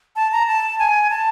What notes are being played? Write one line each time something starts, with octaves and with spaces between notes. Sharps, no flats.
A5
A#5
A5
G#5
A5